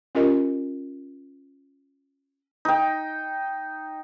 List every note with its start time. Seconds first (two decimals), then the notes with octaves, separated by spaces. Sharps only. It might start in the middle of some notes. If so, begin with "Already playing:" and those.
0.15 C#4 F4 G4 A#4 D#5
2.65 D#4 G5